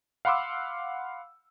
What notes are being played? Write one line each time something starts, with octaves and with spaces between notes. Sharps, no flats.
F5 F#5 B5 C6 D6 E6